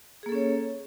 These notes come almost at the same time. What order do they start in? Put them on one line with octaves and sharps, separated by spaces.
G#4 A#3 A4 C#4 C#5